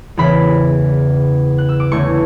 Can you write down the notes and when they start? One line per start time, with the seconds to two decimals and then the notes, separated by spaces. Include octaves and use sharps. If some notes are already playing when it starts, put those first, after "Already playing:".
0.17 E2 C#3 E3 B5
1.58 F#6
1.69 E6
1.80 D6
1.91 E2 D3 A3 C#4 E4 C#6